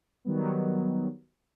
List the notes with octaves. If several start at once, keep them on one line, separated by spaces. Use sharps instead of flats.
D#3 F#3 G3 B3